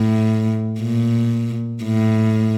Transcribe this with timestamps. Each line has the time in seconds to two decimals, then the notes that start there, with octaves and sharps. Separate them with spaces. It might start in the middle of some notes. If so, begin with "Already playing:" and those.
Already playing: A2
0.80 A#2
1.84 A2